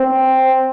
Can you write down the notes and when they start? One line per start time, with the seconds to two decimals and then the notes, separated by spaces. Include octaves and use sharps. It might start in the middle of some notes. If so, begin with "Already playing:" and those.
Already playing: C4